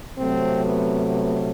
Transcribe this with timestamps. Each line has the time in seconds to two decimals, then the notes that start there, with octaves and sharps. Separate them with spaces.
0.18 C3 F#3 A3 C4
0.64 B3
1.09 B3